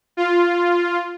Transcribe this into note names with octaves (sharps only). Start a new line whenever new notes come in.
F4